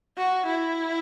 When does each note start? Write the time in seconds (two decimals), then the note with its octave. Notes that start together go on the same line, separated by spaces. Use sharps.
0.17 F#4
0.46 E4